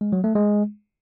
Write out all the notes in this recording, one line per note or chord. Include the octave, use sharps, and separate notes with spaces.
G#3
F#3
A3
G#3